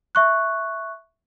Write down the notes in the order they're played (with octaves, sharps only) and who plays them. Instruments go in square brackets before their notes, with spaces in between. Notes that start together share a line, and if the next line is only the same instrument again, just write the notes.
[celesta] E5 C#6 F#6